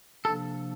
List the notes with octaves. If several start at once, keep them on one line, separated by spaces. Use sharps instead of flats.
C3 F3 A#3 D4 A4